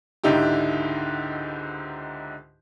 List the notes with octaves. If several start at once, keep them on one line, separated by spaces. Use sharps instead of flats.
C#2 G#2 D3 D#4 E4 G4